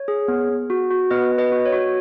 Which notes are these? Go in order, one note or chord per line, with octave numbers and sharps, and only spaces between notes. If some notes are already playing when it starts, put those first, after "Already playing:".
Already playing: C#5
G#4
B3
B3
F#4
F#4
B3 B4 D#5
B3
B4 D#5
F#4
C#5
F#4